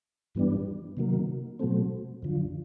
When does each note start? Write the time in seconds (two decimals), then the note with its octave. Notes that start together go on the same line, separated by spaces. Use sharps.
0.35 G2 E3 G3 B3 D4
0.97 C3 D#3 F#3 A#3
1.59 B2 F#3 A3 C4
2.23 F#2 D3 F3